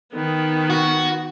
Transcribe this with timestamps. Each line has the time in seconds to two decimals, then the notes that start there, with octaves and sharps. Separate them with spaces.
0.13 D#3 B3
0.70 F#4